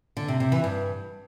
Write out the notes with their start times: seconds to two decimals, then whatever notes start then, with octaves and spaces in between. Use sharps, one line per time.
0.17 D3
0.28 C3
0.40 C3
0.52 E3
0.64 G2